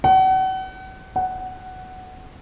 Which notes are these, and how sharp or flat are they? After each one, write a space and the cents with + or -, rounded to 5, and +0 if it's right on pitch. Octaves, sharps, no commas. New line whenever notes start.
F#5 +35
F#5 +10